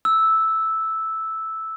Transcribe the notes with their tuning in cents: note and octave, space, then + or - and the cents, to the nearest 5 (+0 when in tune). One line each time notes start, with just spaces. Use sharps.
E6 -5